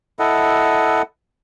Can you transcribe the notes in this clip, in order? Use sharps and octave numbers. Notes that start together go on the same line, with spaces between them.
E4 A4 D#5 F#5